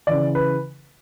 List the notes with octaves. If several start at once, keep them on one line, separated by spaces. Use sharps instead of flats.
C#3 E3 D5
B4